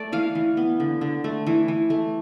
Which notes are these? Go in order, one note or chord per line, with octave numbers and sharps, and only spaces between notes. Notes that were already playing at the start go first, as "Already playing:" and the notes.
Already playing: A3 D5
E3 F5
E3
B3
D3
D3
A3
E3
E3
A3